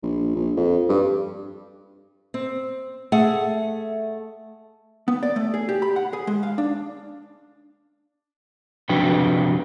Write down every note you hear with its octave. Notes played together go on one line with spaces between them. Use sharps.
A#1
A#1
F2
G2
C4
A3 G#4 F#5
B3
D5
A3
G#4
G4
B5
F#5
G#4
G#3
F5
D4
C3 F3 D4 F#4 B4 G5